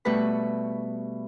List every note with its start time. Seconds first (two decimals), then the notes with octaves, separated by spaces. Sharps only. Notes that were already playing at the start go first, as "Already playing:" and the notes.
0.05 B2 G3 A3 B4 B5